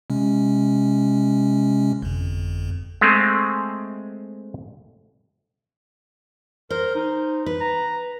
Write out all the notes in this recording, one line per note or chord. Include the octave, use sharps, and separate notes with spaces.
C3 G#3 C#4
G1 F2
G#3 A3 C4
A#4 C5
D#4
B4
A#5